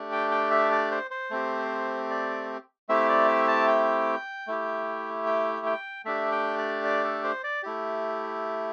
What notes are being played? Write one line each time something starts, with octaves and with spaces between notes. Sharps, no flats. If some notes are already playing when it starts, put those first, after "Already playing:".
Already playing: A3 D4 G4
G5
G5
E5
D5
C5
C5
A3 C4 G4
D5
A3 C4 E4 G4 E5
D5
E5
A5
G5
A3 E4 G4
G5
G5
A3 D4 G4 E5
G5
D5
D5
A4
C5
D5
A3 E4 G4